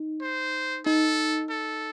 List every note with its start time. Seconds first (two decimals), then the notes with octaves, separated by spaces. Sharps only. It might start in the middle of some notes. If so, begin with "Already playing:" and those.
Already playing: D#4
0.22 C5
0.86 D#4 A4
1.50 A4